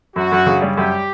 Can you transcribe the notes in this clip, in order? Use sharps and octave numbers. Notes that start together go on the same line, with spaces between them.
F#2 F#4
F#2
C#3
G3
F#2 G4